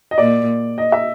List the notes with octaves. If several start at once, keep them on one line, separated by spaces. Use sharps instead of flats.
D#5
A#2 D5
D#5
E5